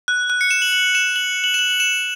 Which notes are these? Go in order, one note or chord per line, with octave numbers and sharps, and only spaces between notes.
F#6
F#6
C#7
E7
F#7
F#7
E7
F#7
F#7
E7
F#7
F#7
E7